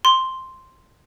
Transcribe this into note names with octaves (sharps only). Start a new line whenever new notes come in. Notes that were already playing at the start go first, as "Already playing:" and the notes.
C6